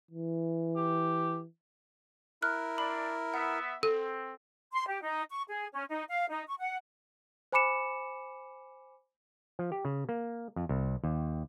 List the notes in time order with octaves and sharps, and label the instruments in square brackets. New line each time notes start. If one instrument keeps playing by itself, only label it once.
[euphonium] E3
[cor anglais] G4
[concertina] E4 A#4 [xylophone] F6 F#6
[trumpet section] D4 D5 [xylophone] B5
[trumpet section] B3 E5 [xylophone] F#5
[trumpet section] C4 [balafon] A4
[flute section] C6
G4
D#4
C#6
G#4
C#4
D#4
F5
D#4
C#6
F#5
[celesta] C5 G#5 B5 D6 C#7 E7
[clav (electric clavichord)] F3
G4
C#3
A#3
F2
C2
D#2